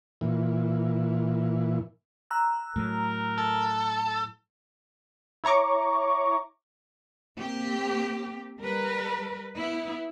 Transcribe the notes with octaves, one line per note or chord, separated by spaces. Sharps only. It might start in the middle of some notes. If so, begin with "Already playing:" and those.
A#2 E3
A#5 E6 F#6
A2 F#3 A#4
A4
E4 C#5 A#5 C#6 D6
A#3 C4 G4
G3 A#4 B4
B3 E4